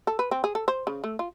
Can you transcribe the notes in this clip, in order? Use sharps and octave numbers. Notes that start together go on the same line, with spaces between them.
A4
B4
C4
G#4
A4
C5
C#3
A3
F4